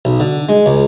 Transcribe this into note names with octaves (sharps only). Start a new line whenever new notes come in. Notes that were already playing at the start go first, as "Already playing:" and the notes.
B1
D3
G#3
C#2